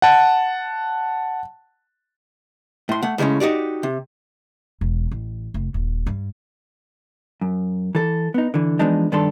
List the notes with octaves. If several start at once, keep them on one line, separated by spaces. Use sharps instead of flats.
F#5 A5
A2 C6
A3 F#5
A2 C#3 G3 G#3 C#4
D#4 F#4 G4 D5
C3
E1
A1
F1
D#1
G2
F#2
E3 A4
B3 D#4
D3 E3
E3 F3 G#3 B3 D4 D#4
G2 D#3 D4 G4 A4 C6